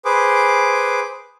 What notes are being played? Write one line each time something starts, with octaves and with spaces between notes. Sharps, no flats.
G#4 B4 C5 D6